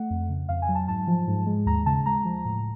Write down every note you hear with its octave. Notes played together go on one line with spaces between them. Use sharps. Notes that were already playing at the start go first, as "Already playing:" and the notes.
Already playing: A3 F#5
F2
C#3
F2 F5
G#5
F#3
A5
G#2 A5
F3
G#2
G#3
D#2 A#5
C#3 A5
G#3 A#5
F3
A2